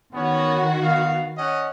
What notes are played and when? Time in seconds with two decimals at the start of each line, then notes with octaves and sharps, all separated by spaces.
0.14 D#3 B3 C#4 F#4 C#5
0.81 B3 F5
1.38 C#4 D#5 F#5